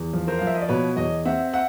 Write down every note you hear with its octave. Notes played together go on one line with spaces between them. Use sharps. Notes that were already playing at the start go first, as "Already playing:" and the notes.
Already playing: E2
F3
A#4 C5
F5
F3
E5
D#5
D5
B2 B4 C#5
E2 C#5 D#5
C4 E5 F#5
E5 F#5